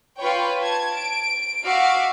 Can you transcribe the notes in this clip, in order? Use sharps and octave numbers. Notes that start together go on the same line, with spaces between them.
F4 B4 C#5 G5
A5 G#6
D7
F#4 E5 F5 D6